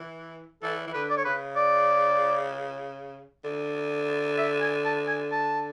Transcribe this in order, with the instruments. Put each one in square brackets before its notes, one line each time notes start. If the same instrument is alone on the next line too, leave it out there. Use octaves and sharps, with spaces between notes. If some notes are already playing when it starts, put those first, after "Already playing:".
Already playing: [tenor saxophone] E3
[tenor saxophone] E3 [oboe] A4
[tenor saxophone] E3
[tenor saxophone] D3 [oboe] B4
[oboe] D5
C#5
[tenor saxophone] C#3 [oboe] B4
[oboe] D5
[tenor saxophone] D3
[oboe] E5
G#5
A5
G#5
A5